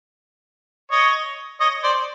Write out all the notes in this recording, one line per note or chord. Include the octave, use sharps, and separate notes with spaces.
C#5 D#5
C#5 D#5
C5 D5